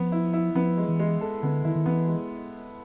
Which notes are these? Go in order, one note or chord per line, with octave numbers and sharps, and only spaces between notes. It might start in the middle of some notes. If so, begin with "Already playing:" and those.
Already playing: F3 B3
E4
E4
F3 B3
G#3
E3
G#3
A4
D3 B3
D#3 E4
D#3
E3 B3
G#3